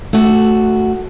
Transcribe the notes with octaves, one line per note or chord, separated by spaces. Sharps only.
A3 F#4